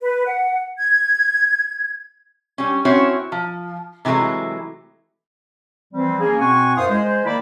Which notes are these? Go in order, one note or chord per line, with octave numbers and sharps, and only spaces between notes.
B4
F#5
G#6
G3 C#4
C4 C#4 E4 F#4 C#5
F3
C3 E3 F#3 G#3 A3
E3 F3 G3 C4
A#3 C#4 G#4
B2 C4 F#5 G#5 C#6
F#2 E4 C5 F5 C6 D#6
G#3 C5
D#3 A#3 E4 D5 B5